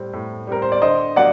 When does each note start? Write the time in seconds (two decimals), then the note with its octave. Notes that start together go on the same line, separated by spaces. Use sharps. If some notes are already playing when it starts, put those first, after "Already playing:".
Already playing: A2 G3 C4
0.13 A2
0.47 G3 C4 A#4
0.62 C5
0.72 D5
0.82 D3 C5 D#5
1.16 F#3 A#3 D5 F#5